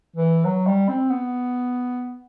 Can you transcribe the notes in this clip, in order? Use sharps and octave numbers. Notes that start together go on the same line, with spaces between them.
E3
F#3
G3
C4
B3